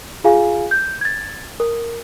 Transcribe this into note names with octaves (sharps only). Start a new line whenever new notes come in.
F4 G#4 F5 G#5
G6
G#6 A6
A#4